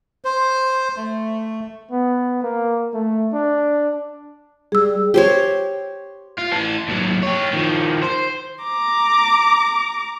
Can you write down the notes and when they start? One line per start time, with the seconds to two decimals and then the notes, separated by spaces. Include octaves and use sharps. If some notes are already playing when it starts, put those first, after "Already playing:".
0.25 C5
0.97 A3
1.92 B3
2.43 A#3
2.94 A3
3.33 D4
4.72 G3 G#4 E6
5.14 G4 C5 C#5
6.39 F4
6.53 E3 A4
6.88 D#2 F#3
7.23 G4 C#5
7.53 D#3 F3
8.02 C5
8.64 A#5 D6